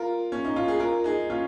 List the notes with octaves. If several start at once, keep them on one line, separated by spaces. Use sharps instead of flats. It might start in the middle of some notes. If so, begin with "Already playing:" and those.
Already playing: F4 A#4
C#4
D#4
F4
G#4
F4 A#4
D#4 G#4
C#4 F4